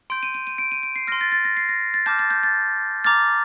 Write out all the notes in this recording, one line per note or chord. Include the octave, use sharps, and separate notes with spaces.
C6 G6 D7
D#7
D#7
D#7
D7
D#7
D7
C7
C6 F6 A#6
A6
A6
A#6
C7
A#6
A6
A5 D6 F6 G6
A6
G6
A6
A#5 D6 F6 A6